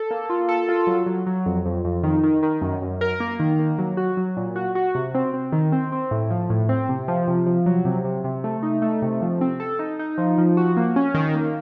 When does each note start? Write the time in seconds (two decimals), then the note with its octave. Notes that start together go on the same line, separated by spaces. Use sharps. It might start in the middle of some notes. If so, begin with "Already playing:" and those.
Already playing: A4
0.11 A#3
0.30 F4
0.49 A4
0.69 F4
0.87 F#3
1.06 F#3
1.27 F#3
1.46 F2
1.65 F2
1.85 F2
2.03 D#3
2.23 D#3
2.43 D#3
2.61 F#2
2.82 F#2
3.01 A#4
3.20 A#3
3.40 D#3
3.59 A#3
3.79 F#3
3.97 F#4
4.17 F#3
4.37 A#2
4.56 F#4
4.75 F#4
4.95 C3
5.15 C4
5.34 C4
5.52 D#3
5.72 C4
5.92 C4
6.11 A2
6.30 F3
6.50 A2
6.69 C4
6.89 C3
7.08 F3
7.28 C3
7.46 F3
7.66 F#3
7.85 C3
8.04 C3
8.24 C3
8.44 A3
8.63 D#4
8.82 A3
9.02 C3
9.22 F3
9.41 C4
9.60 A4
9.79 D#4
9.99 D#4
10.18 F3
10.38 F3
10.57 F#4
10.77 A#3
10.96 C#4
11.14 D#3
11.35 A#3